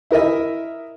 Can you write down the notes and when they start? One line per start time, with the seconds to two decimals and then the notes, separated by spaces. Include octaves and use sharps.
0.11 E4 A#4 D#5 E5